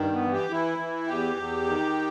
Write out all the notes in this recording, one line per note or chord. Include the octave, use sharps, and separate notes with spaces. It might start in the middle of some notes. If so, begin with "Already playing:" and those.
Already playing: G2 D#3
B3
E3
G4
E3 E4
E3
E2 G4
E2
D#3